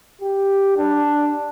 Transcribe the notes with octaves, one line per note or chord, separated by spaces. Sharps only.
G4
D4